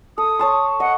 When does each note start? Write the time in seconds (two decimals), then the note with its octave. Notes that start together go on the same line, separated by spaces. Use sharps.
0.18 A4 D#6
0.39 C#5 A5 C6
0.80 D#5 F#5